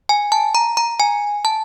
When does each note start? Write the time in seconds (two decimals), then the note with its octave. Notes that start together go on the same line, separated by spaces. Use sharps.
0.09 G#5
0.32 A5
0.55 A#5
0.77 A#5
1.00 G#5
1.45 A5